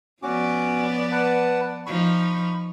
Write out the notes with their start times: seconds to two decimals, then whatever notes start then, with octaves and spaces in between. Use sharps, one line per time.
0.22 F3 B3 C#4 F#4 D5 D6
1.12 B4 F#5 A5
1.86 F3 D#4 B5 C#6